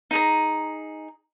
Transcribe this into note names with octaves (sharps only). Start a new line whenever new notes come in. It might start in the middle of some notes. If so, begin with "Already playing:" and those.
D#4 G#4 A#5